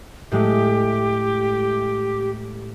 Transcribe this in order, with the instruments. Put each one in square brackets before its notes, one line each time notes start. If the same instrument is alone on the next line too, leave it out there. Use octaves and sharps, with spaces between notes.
[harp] A2 G#3 A3 [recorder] G4